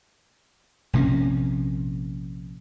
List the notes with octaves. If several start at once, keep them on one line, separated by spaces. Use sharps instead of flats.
A#1 C3 A#3 C#4